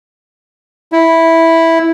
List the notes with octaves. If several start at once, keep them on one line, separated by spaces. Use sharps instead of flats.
E4